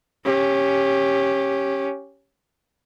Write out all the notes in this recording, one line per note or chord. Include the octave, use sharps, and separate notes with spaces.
C#4 G4